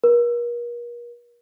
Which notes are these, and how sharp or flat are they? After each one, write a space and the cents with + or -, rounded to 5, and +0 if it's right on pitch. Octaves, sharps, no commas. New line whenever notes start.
A#4 +40